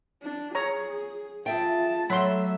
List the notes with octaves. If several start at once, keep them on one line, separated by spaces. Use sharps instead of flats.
D4
G#4 C#5 A#5
F4 G#4 E5 G5 A5
F#3 A3 E5 B5 C6